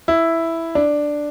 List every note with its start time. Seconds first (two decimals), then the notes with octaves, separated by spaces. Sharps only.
0.08 E4
0.75 D4